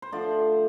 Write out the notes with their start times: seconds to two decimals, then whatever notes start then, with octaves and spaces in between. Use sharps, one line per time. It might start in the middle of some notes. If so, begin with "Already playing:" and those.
0.02 C5
0.12 D3 F3 A3 D4 D5